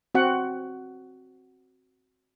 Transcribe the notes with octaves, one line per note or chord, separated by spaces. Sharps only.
C4 F#4 F#5